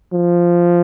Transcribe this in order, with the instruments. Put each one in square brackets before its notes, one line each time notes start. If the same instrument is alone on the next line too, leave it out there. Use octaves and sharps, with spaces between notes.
[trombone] F3